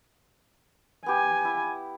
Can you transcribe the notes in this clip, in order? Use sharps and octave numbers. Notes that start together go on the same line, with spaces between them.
B3 G4 G#5
E4